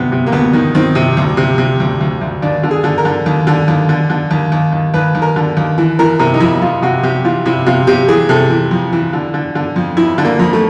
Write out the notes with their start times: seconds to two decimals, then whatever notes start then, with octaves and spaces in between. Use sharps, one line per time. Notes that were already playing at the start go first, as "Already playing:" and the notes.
Already playing: D2 C3 B3
0.12 C3
0.26 A#3
0.32 D2 B3
0.53 D#3
0.75 D#3 C4
0.95 C3
1.17 D2
1.37 C3
1.58 C3
1.80 D2
2.01 D2
2.21 D2
2.42 D#2 D4
2.63 D3
2.71 G#4
2.84 D3
2.98 A#4
3.05 D3
3.26 D#2
3.47 D3
3.68 D#2
3.89 D3
4.10 D3
4.31 D#2
4.52 D#2
4.72 D#2
4.94 D#2 B4
5.15 D#2
5.22 A#4
5.36 D3
5.57 D#2
5.78 E3
5.99 E3 A#4
6.19 C3 A#4
6.34 D#4
6.40 F2 E4
6.62 F2 F4
6.82 C3 F#4
7.03 C3 G4
7.24 E3 F4
7.46 C3 E4
7.66 C3 F4
7.87 C3 G4
8.08 E3 G#4
8.29 C3 A4
8.50 E3
8.71 F2
8.92 E3
9.13 D3
9.34 D3
9.55 D3
9.76 F2
9.97 F2 E4
10.18 D3
10.25 A#3
10.39 F2
10.53 A3